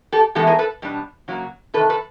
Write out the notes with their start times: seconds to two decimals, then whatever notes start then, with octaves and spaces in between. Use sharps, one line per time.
0.12 G4 A4
0.35 A2 E3 G#3 B3 E4 G4 A4
0.47 G#4 A#4
0.59 A4 B4
0.82 B2 G3 B3 D4
1.28 C#3 F#3 A#3
1.74 C3 D#3 A4 B4
1.90 A4 B4